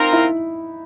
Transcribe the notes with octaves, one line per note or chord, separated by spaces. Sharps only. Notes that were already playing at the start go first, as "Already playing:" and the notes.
Already playing: C4 D#4 F4 A#4
E4